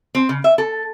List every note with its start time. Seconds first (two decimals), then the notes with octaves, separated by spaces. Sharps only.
0.15 C4
0.29 C#3
0.44 E5
0.58 A4